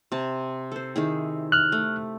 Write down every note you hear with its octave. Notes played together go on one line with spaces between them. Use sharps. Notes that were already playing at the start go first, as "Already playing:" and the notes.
C3 A5
A4 C5
D#3 E4 G#4
F6 F#6
A3